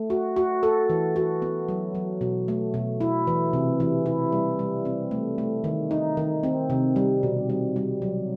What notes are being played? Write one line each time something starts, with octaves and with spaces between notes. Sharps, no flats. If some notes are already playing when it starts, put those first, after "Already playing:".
Already playing: A3
F#4
F#4
A4
E3
F#4
B3
F#3
F#3
B2
A3
B2
E4
E3
C3
E3
E4
G3
G3
C4
A3
A3
D#3
D#4
D#3
C4
C3
G3
B2
G3
G3
F#3